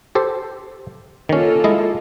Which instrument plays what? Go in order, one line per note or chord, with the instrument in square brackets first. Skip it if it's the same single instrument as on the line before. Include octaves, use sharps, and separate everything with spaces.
[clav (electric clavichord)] G4 A4 C5
[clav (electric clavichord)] D#3 C#4 [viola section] A#3 F4 A4
[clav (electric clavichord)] G#3 E4 D#5